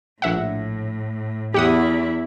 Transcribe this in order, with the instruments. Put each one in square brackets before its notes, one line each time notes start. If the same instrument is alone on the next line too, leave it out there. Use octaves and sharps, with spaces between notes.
[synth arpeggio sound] A#1 E5 F#5 [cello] A2
[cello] E2 E4 [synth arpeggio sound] G4 F#5 D#6